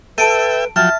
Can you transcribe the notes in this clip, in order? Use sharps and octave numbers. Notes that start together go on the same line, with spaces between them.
A4 B4 E5 G5 A5 D7 D#7
F3 F#3 E5 G5 A5 F6